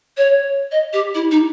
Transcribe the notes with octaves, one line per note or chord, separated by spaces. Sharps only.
C#5
D#5
G4
E4
D#4